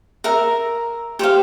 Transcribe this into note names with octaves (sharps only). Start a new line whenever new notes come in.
A#4 E5 A#5
G4 C5 F5